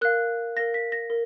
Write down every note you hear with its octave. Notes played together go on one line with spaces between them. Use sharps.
A#4 F5 F#6
A#4 F5 A#6
B6
A#6
A#4